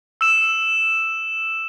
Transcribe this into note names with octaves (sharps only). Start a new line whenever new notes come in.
E6 E7